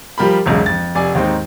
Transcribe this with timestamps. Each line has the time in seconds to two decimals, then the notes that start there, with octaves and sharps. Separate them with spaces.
0.18 F3 G3 G4 A#4 B5
0.46 E1 B1 C#3
0.66 F2 A6
0.95 F1 D5 G#5
1.15 D#2 G#2 C4 D#4